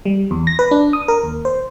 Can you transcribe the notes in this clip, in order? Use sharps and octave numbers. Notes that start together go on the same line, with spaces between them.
G3
E2
A#6
B4
D4
D#6
A#4
D#2
C5